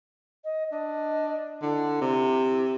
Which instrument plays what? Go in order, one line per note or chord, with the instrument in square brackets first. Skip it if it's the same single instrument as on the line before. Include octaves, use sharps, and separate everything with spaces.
[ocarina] D#5
[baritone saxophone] D4 [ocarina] D#5
[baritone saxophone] D3 [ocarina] E4
[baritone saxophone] C3